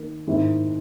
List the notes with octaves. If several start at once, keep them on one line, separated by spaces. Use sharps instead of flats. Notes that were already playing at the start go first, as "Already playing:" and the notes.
Already playing: D#3 A#3
G#2 D#3 A#3 E4